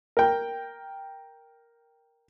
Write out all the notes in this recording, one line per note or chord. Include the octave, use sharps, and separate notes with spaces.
A#4 G5